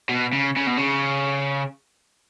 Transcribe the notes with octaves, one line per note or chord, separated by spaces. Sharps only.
B2
C#3
C#3
B2
C#3